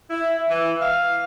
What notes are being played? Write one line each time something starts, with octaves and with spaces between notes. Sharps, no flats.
E4
E3
F5